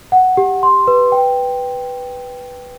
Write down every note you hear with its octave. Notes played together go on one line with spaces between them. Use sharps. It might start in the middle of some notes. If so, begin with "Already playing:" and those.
F#5
G4
C6
B4
G5